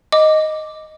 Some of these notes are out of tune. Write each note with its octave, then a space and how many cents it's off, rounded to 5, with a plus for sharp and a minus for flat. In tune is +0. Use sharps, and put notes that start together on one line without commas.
D#5 +0 D6 +0